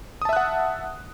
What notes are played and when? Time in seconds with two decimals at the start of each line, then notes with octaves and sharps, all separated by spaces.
0.22 D#6
0.25 A5
0.29 E5
0.33 F#6
0.37 F#5